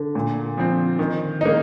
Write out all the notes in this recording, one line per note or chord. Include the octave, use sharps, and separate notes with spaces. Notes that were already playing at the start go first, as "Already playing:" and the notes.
Already playing: D3
A#2
F3 C4
D#3
A#3 D#4